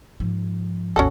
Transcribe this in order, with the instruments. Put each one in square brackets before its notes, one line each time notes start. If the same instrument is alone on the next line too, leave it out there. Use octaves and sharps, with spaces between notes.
[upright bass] G#2 F3
[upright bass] G#1 D#2 [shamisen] C#4 F#4 A4